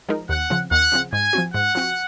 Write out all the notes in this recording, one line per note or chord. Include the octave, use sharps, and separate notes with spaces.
F3 G#3 D#4 A#4
D#2 F#5
C#3 F3 C4
D#2 F#5
C#3 F3 C4
G#2 G#5
F3 C4 F#4
G#2 F#5
F3 C4 F#4